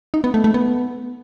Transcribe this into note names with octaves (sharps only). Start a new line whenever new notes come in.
D#4
B3
A3
A3
B3